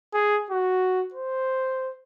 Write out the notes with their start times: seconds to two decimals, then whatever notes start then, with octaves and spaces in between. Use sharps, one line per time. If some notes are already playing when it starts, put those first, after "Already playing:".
0.14 G#4
0.51 F#4
1.14 C5